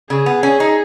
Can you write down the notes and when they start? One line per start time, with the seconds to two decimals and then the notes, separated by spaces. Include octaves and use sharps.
0.10 C#3 G#4
0.26 B3
0.43 C#4
0.60 D#4